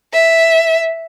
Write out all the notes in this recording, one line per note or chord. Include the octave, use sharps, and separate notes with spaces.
E5